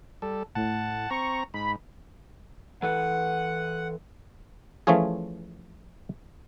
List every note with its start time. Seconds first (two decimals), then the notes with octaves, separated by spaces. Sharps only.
0.22 G3 A4
0.55 A2 F#5 A5
1.11 C4 A#5 C#6
1.54 G#2 B5
2.82 E3 A4 B4 F#5
4.87 E3 F3 A3 C#4 F4 G#4